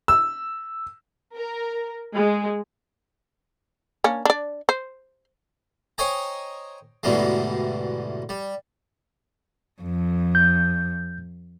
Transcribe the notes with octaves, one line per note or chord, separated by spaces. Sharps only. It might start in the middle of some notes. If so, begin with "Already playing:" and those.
E6
A#4
G#3
A#3 C#4 D4
D4 D5
C5
C5 C#5 D#5 G5 G#5 A#5
D2 G#2 B2 E3 G3 G#3
G3
F2
G6